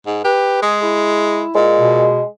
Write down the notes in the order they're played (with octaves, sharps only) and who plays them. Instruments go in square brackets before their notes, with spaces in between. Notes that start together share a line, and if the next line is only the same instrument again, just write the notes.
[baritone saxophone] G#2
[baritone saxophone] G4 [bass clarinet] B4
[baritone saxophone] G#3 [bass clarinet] G#4
[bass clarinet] E4
[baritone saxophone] A#2 [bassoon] G#3
[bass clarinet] B2